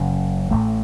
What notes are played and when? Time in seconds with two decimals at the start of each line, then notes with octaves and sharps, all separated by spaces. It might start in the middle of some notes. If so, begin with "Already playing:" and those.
Already playing: F#1 F#2 C#3
0.51 A1 A2 A3